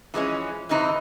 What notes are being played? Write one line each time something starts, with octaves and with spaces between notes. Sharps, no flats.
E3 F3 G#3 C#4
A2 C3 E3 D#4 E4 C5